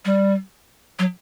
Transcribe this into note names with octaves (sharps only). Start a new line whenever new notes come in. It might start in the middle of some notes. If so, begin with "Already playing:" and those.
G3
F#3